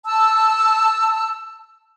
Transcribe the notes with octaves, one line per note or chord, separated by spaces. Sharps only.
A5 E6